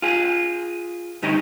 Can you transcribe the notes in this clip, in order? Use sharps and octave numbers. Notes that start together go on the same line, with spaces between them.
F4 G#4
G2 D3 D#4 G4 C#5 D#5